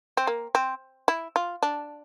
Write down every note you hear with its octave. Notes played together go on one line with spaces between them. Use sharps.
C4
A#3
C4
E4
F4
D4